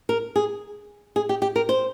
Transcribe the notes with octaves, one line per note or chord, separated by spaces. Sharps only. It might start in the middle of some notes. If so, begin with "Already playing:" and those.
A#4
G#4
G#4
G4
G4
A#4
C5